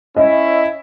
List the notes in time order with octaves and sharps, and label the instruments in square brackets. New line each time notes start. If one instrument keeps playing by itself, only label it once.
[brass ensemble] C#4 E4 [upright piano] D#5